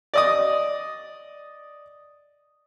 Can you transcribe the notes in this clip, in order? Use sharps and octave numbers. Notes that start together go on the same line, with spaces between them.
D5 D#5 D#6